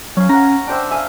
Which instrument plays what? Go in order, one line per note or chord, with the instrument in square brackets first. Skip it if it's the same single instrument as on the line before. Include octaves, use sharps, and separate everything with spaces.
[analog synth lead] F#3 [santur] C#4 F5
[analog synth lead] C#4 [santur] F#5 A#5
[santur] D4 C5 E5 [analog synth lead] G5
[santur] E5 F5 [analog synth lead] G#5